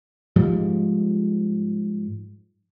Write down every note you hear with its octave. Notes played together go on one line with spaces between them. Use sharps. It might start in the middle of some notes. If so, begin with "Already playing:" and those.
G#2 F3 G3 G#3